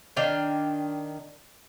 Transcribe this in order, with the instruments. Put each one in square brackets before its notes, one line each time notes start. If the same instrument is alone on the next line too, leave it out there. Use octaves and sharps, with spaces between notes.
[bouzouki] D#3 D4 F5 G5